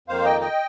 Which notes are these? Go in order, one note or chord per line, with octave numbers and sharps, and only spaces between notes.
F2 D#3 A#3 C5 F5
D#5 G5
D#5 G5